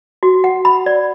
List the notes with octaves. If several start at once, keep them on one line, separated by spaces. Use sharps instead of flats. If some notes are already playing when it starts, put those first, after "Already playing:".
F#4
F#5
B5
D5